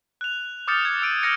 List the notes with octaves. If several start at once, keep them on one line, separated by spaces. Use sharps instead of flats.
F#6 F7
D6 D#6 F6 G6 A6 C#7
G#6
E6 D7 D#7
F6 G6 G#6 A#6 C#7 D#7